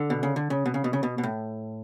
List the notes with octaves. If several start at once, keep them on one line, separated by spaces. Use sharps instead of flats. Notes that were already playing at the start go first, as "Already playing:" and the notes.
Already playing: D3
B2
C#3
D3
C#3
B2
C#3
B2
C#3
B2
B2
A2